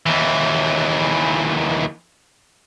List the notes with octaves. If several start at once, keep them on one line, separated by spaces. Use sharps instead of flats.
D#2 E3